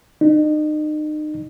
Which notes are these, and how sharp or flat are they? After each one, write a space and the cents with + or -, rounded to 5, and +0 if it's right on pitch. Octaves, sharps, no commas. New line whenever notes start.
D#4 -35